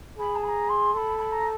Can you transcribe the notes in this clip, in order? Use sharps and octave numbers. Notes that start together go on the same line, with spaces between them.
G#4 B5
A5
B5
A#5
C6
A4 B5 C6
B5
A#5